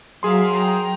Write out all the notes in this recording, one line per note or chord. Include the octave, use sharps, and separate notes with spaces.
F#3 G#4 A#4 E5 F5 C6
G5 A#5